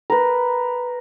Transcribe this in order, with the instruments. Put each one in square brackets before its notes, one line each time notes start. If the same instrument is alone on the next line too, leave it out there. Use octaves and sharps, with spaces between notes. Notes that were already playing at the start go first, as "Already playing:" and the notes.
[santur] A#4 B4